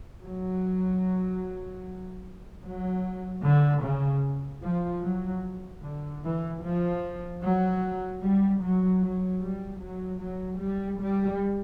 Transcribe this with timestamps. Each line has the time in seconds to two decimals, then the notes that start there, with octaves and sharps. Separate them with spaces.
0.23 F#3
2.63 F#3
3.43 D3
3.83 C#3
4.62 F3
5.02 F#3
5.82 D3
6.22 E3
6.61 F3
7.41 F#3
8.21 G3
8.61 F#3
9.01 F#3
9.41 G3
9.81 F#3
10.21 F#3
10.61 G3
11.00 G3